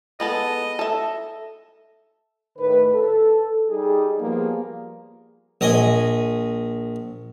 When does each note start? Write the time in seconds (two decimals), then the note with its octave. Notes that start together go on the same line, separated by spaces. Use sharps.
0.20 G#3 B3 A4 D#5
0.79 A4 E5
2.58 A2 D#3 B4
2.93 A4
3.69 G3 D#4 G#4
4.19 F3 G3 A#3 B3 G#4
5.61 A#1 D#5 G#5 D#6